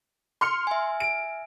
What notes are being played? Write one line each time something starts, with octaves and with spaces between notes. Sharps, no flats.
C6 F6 C#7
E5 G#5
D7